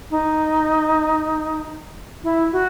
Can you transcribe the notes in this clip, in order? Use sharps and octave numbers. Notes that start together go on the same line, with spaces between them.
D#4
E4
F#4